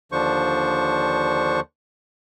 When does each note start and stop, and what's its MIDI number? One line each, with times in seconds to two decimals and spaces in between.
0.12 1.60 39
0.12 1.60 50
0.12 1.60 53
0.12 1.60 62
0.12 1.60 72
0.12 1.60 85